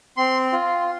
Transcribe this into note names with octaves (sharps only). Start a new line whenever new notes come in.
C4 C6
F4